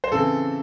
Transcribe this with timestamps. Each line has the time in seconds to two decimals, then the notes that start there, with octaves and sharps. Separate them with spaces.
0.04 C5
0.12 C#3 E3 C4 A4